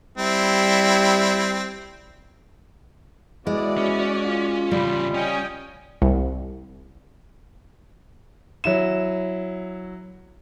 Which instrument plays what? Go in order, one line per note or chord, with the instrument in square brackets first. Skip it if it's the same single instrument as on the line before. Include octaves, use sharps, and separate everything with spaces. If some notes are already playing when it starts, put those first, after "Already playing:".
[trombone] G3 [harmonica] C4 E4
[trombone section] E3 B3 E4 [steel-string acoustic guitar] G#3 [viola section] F#4 D5
[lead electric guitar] C#4
[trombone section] F4
[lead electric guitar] E2 C#3 [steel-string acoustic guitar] G3 [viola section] B5
[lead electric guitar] C#4 [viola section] D#5 G5 G#5
[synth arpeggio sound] C2
[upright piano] F#3 E4 E7